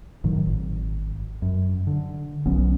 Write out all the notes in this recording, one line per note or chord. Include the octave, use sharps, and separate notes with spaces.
A2 D#3 F#3
G#1
F#2
D3
B1 F#3 B3 C#4